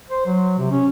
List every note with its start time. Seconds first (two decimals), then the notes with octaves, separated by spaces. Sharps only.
0.10 C5
0.27 F#3
0.58 C3
0.71 C#4